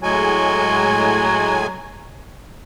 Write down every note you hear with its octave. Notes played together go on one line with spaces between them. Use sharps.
A2 F#3 G#3 G#5